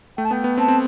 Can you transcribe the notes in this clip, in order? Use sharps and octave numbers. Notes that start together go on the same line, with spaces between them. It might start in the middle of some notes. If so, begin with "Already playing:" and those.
A3 G5
A5
B3 G5
B3
C4 A5
C4